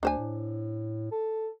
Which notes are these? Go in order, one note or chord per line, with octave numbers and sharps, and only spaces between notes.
D2 D4 C5 G#5
A2
A4